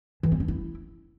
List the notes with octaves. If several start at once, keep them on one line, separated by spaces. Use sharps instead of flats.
E3
C4
C#4
E4